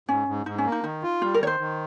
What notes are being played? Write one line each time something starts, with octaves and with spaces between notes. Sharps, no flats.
G#2 C#4
G#2
G#2 D#4
C#4
A#3
D#4
D#3 D#4
F4
G3 F4
A#4
D#3 C#5
C5
D#3